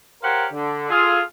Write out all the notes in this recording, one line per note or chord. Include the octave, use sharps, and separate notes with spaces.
G4 A#4 C5 C#5 F5 F#5
D3
F4 G#4 A4